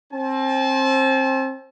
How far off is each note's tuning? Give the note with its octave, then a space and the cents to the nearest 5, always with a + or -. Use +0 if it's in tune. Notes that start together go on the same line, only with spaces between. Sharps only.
C4 +25 A5 -30